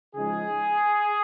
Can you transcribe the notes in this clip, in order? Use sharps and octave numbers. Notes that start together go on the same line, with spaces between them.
C#3 F3 G#3 D#4 G#4